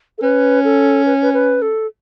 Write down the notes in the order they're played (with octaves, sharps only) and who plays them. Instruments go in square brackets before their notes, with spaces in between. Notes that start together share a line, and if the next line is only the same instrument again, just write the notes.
[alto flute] A4
[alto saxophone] C#4 [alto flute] B4
[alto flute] A4
B4
B4
B4
A4